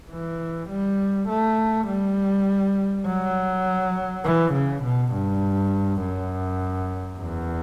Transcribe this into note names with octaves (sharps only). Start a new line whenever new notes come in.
E3
G3
A3
G3
F#3
E3
C#3
B2
G2
F#2
E2